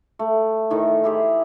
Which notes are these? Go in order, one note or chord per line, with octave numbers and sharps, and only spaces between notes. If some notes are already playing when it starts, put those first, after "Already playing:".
A3
A2 D#3 E3
E4 G4 G#4 C5